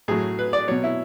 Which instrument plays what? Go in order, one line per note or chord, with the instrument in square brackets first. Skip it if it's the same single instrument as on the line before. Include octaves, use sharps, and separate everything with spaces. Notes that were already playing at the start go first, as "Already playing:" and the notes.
[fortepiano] A2 F#3 G#4
B4
D5
B2 F#3 C#5
E4